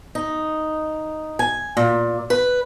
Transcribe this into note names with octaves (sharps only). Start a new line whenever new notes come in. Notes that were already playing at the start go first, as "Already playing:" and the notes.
D#4
G#5
A#2
B4